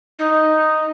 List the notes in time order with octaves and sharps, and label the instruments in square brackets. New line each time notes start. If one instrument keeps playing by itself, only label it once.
[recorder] D#4